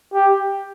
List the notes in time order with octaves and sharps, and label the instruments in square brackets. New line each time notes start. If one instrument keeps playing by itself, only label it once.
[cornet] G4